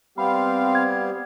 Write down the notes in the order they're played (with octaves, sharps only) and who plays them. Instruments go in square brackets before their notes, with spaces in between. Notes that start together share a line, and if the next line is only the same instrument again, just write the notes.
[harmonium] G3 B3 G4 [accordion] C4 F5 [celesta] B5
[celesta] G#6